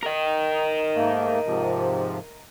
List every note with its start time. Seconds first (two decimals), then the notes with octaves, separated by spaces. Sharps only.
0.03 A#4 D#5
0.95 G#2 A3 A#3
1.45 G#2 C3 F3